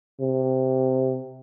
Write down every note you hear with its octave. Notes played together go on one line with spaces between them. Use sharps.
C3